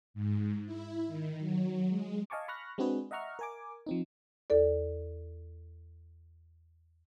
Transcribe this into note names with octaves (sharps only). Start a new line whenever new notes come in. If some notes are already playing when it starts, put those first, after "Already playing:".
G#2
E4
D#3
F#3
G#3
D#5 F5 G#5 A5 C#6 D6
B5 C#6 F6 F#6 A#6
G#3 C4 D4 F#4 G#4 B4
D#5 E5 F#5 A#5 C#6 F6
A#4 G#5 D6
F3 C4 D#4
E2 A4 D5